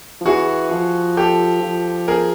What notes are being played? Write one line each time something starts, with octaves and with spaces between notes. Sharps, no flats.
F3
E3 F#4 G#4
F3
G4 A4
F3
G#4 A#4